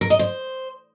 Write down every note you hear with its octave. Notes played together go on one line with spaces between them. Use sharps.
A#4
D#5
C5